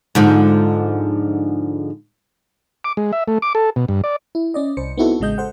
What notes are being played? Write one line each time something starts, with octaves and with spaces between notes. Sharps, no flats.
G#2 D3 F3
D6
G#3
E5
A3
D6
A4
B2
G2
D5
E4
C#4 D5 D#5
C2 C5 C#7
B3 C4 D#4 E4 F#4 A4
A1 C#3 G#3 D#5 G6
A4 C5 F#5